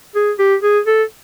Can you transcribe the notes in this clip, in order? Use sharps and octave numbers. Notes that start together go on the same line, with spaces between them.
G#4
G4
G#4
A4